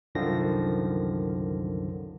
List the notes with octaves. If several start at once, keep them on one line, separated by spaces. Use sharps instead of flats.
C2 F#2 D3 D#3 F3 A#6